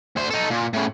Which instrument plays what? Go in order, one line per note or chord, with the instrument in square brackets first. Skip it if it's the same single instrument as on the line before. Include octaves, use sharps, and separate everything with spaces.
[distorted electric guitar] D2 C5
D#4 A4
A#2
A2 C#3